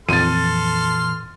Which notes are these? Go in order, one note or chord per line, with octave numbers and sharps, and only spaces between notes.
F2 A#2 E3 A4 C6 F6 A6 D#7